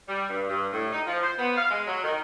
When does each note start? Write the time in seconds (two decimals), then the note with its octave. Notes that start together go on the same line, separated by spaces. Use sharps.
0.08 G3
0.30 G2
0.49 G2
0.73 A2
0.93 D#4
1.07 F3
1.23 C5
1.39 B3
1.57 F5
1.71 G#3
1.87 F#3
2.04 D#3